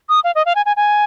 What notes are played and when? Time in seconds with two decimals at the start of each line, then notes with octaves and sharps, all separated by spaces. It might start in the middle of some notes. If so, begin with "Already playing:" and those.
0.09 D#6
0.24 F5
0.35 D#5
0.46 F5
0.56 G#5
0.66 G#5
0.77 G#5